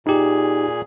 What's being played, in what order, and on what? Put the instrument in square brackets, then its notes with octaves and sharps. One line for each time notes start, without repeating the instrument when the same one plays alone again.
[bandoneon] A#2 G#4 [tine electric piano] D#4 G4